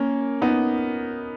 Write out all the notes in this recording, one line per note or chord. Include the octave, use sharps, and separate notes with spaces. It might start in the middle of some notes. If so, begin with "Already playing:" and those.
Already playing: A#3 C#4
B3 D#4